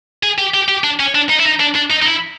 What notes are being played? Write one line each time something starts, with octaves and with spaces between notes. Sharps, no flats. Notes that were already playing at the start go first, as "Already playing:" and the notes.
G#4
G4
G4
G4
D4
C#4
D4
D#4
E4
D#4
D4
D4
D#4
D#4
E4